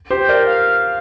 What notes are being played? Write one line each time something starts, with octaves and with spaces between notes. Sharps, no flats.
G4 C5
G5
A#4 D5
F5